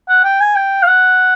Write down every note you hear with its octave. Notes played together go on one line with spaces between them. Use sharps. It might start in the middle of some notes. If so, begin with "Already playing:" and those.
F#5
G5
G#5
G5
F5
F#5